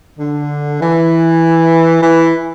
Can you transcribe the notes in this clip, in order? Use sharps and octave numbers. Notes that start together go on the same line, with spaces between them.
D3
E3
E3